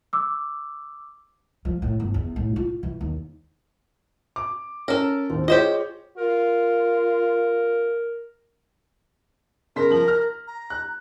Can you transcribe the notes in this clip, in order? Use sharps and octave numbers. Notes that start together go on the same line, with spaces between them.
D6 E6
F3
A2
G1
E2
A2
F4
E3
D#2
D6
C#4 A4 A#4
D#2 C4
F4 G4 G#4 C5 C#5 D#5
F4 A#4
C#3 A#4 C6 B6
F3 F#7
F6
A#5
F#6